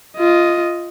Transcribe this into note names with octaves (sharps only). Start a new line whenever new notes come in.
F4 D#5